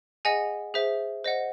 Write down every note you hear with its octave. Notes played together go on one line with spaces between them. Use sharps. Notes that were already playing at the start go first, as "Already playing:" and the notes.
G#4 D#5 F#5 G#5
G#4 C5 E5
C5 D#5 F#5